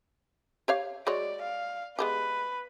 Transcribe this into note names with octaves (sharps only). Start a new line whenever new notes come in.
G4 C#5 F5
G#3 F#4 C#5 D5
F5
G#3 B3 G4 B4